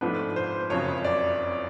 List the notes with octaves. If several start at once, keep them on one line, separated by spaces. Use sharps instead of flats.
G#2 F3 A3 D4 B4
C5
F#1 F2 C#3 F#3 C#5
D5